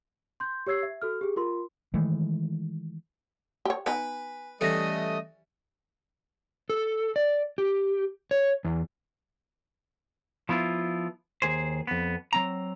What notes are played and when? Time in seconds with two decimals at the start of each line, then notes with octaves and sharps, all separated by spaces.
0.40 C6 G6
0.67 G4 C#5 E6 G#6 C7
0.83 E5
1.02 F#4 A4 F6
1.21 G4 G#4
1.36 F4 A#4 C6
1.94 D#3 E3 G#3 A3
3.65 G4 C#5
3.86 B3 D#4 B4 G#5
4.61 E3 G3 A3 C#4 A4 D#5 D#6 A#6
6.70 A4
7.16 D5
7.58 G4
8.31 C#5
8.65 E2
10.49 F3 B3 E4 F4
11.42 D#2 G#4 C5
11.87 F2 B3
12.33 F#3 C4 A#5